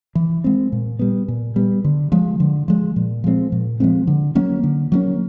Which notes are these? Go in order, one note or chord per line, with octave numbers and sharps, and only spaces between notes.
E3
G#3 C4
A#2
G3 B3
A#2
G3 B3
D3
F3 G#3
D3
F3 G#3
A#2
F3 G#3 C4
A#2
F3 G#3 C4
D3
F#3 A#3 C#4
D3
F#3 A#3 C#4